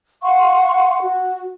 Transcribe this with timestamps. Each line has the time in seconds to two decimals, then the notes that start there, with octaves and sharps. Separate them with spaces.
0.22 F5 F#5 C6 C#6
1.01 F#4